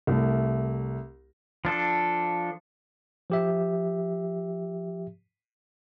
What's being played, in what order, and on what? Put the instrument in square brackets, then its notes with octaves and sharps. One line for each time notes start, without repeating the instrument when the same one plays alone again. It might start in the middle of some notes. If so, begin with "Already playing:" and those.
[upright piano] C2 A3
[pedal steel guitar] F3 D4 A4
[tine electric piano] F3 G4 E5